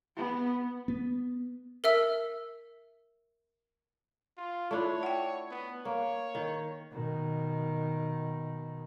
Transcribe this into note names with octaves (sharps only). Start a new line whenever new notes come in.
B3
B3
A#4 E5 E6
F4
A3 D4 E4 F4 C#5
F#5 G5
B3
A#3 C#5
D#3
B2 D#3